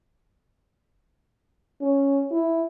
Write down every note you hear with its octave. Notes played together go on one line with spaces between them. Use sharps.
C#4
E4